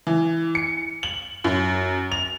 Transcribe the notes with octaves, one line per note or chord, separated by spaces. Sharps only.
E3
C#7
F#7
F#2
F7